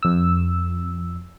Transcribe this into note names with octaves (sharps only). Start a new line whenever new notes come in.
F2 E6